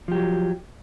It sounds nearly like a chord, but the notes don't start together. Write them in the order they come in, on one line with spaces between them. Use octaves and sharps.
F3 G4 F#3